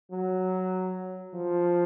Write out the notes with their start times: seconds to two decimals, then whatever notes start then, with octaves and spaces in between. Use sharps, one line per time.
0.11 F#3
1.34 F3